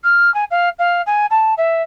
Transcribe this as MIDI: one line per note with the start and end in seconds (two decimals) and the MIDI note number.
0.04 0.33 89
0.34 0.45 80
0.51 0.69 77
0.79 1.02 77
1.07 1.26 80
1.31 1.54 81
1.58 1.82 76